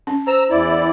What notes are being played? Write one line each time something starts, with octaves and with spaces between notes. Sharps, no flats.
C#4
C5 A#5 E6
E2 E4 D5